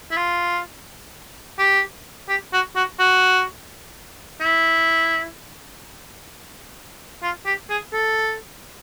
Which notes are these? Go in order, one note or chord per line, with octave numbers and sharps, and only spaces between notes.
E4
F4
G4
G4
F#4
F#4
F#4
E4
F4
G4
G#4
A4